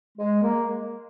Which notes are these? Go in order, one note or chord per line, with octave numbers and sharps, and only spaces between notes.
G#3
A#3